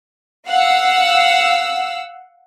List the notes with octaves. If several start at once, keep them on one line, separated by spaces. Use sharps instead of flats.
F5 F#5 E6